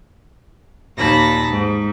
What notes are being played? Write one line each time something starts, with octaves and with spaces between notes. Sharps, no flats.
D#2 A#2 A5 B5 A#6
G#2